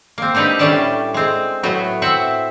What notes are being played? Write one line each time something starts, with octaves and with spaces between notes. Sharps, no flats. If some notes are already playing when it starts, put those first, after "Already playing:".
A#3 C4
C4 D4 D#4 G4 B4
A2 G3 C#4 D4 D5 A5
G#3 C4
A2 F#3 B3 F#4
C4 E5 F#5